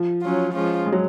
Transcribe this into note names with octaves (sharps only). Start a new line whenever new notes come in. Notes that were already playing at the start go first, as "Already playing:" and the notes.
Already playing: F3
F#3 C#4 F4
F3 G#3 C#4 F4
G#3
F#3